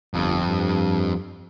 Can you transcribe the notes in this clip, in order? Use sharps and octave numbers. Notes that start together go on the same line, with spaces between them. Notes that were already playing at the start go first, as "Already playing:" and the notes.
G1 F2
G2